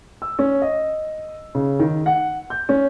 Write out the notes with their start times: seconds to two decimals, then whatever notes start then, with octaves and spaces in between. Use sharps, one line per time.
0.22 E6
0.39 C#4
0.62 D#5
1.55 C#3
1.80 D#3
2.06 F#5
2.50 G6
2.69 C#4